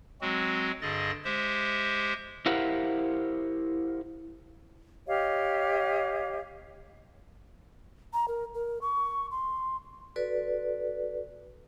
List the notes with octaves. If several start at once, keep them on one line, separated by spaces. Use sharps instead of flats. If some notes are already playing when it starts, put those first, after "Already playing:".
F#3 G#3 C4 F#4
G2 D3 G#4 D#5 A6
G#3 G4 C5 E5
E4 G4 A#4 C5 F5 F#5
G4 C#5 D#5 F5
A#5
A#4
A#4
C#6
C6
F#4 A4 B4 D5